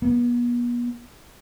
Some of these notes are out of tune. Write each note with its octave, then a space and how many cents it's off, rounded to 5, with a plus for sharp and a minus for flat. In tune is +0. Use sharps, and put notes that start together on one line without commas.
B3 -40